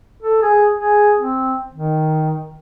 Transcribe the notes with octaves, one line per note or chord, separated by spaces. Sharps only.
A4
G#4
G#4
C4
D#3